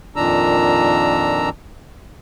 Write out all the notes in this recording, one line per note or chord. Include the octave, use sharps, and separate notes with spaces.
F2 A#2 D#3 D4 A#5 E6